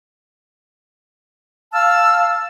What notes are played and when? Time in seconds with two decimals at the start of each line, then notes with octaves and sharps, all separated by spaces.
1.72 F5 A5 E6 F6